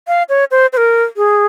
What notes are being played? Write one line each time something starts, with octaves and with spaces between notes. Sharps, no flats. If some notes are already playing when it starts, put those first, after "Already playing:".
F5
C#5
C5
C5
A#4
G#4